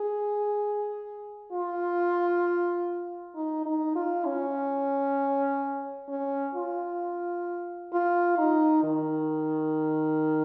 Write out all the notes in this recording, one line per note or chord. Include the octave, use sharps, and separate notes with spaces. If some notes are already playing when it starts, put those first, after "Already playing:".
Already playing: G#4
F4
D#4
D#4
F4
C#4
C#4
F4
F4
D#4
D#3